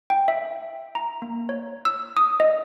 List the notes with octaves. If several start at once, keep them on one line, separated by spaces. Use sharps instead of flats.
G5
E5
A#5
A#3
C#5
E6
D#6
D#5